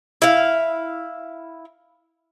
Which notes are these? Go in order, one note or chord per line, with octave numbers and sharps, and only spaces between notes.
E4 F5